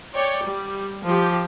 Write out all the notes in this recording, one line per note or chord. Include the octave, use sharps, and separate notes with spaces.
C#5 D5 G5
G3
F3 G4